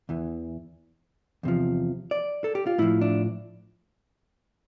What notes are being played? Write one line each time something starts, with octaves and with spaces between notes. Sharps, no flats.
E2 E3
E2 C3 F3
D5
A4
G4
F4
A2 F3 E4
D4